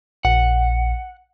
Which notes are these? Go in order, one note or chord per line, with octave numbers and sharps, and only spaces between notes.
A#1 F#5